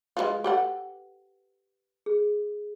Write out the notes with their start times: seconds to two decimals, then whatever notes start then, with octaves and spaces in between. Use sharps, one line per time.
0.17 G#3 E4 F4 B4 C5
0.44 G4 A4 F#5
2.06 G#4